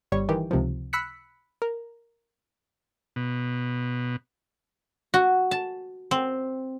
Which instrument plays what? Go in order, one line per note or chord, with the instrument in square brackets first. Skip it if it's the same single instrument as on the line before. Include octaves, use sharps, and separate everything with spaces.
[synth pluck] G1 G3 C#5
D#3 E3 G4
C#2 C3 D#3 F3
B5 E6 F#6 B6 C#7
A#4
[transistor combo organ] B2
[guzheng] F#4
A5
C4